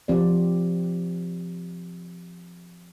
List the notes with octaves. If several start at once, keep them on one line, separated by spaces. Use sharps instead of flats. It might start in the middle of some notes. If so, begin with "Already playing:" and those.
F3 C4 G4 D5